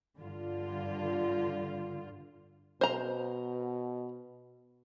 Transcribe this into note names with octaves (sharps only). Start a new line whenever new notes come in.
G2 D3 F4
B2 C5 A#5